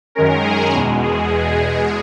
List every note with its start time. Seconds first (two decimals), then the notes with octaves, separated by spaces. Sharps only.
0.15 F#2 D#3 G#3 C#4 A#4
0.44 G#4
0.73 E2 B2 G#3
1.02 G#4